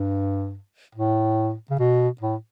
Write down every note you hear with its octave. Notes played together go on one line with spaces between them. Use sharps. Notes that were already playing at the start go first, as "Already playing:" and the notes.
Already playing: G2
A2
C#3
B2
A2